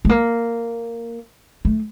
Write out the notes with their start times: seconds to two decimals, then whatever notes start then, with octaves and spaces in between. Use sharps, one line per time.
0.05 A3
0.09 A#3
1.65 A3